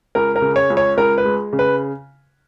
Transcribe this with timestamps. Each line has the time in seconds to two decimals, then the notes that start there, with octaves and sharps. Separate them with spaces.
0.15 C#2 A#4
0.36 A#4
0.41 C#3
0.56 C#5
0.70 C#2
0.77 C#5
0.97 C#2 A#4
1.18 B4
1.25 G#3
1.53 C#3
1.59 B4